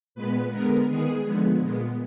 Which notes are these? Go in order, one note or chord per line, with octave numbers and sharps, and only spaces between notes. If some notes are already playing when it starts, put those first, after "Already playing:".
A#2 G#3 B3 B4
D3 G#3 B3 A#4
D#3 G#3 B3 G#4
D3 F3 G#3 B3
A#2 G#3 B3